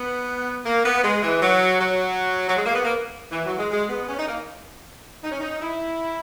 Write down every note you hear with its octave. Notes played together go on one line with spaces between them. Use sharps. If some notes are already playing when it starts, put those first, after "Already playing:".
Already playing: B3
A#3
B3
G#3
E3
F#3
F#3
F#3
G#3
A#3
B3
A#3
E3
F#3
G#3
G#3
B3
C#4
D#4
A#3
D#4
C#4
D#4
E4